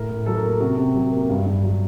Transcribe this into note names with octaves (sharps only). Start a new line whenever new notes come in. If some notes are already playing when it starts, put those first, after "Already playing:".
Already playing: A2 A#4
A2
F#3 A4
A#4
A#3 A4
C3 F#4
C3
F#3
A#3
G2
G2
F#3